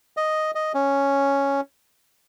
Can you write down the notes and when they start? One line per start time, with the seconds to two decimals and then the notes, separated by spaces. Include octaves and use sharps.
0.17 D#5
0.55 D#5
0.74 C#4